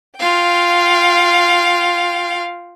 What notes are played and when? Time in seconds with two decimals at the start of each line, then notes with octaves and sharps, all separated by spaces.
0.18 F4 F5 G5